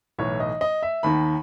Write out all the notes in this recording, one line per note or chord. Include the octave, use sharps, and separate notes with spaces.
B1 A2 E3 C#5
D#5
D#5
E5
D#2 D#3 B5